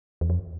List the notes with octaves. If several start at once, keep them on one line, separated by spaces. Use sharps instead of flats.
E2
F2